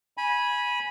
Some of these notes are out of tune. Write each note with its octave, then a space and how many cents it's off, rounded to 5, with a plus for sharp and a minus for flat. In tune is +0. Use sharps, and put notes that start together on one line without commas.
G#5 +0 B5 -20